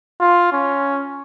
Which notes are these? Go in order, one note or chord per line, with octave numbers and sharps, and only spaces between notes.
F4
C#4